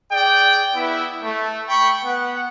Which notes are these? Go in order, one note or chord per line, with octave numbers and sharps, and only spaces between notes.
G#4 D5 G5
B3 E4
A3
G5 B5 C#6
B3 F#5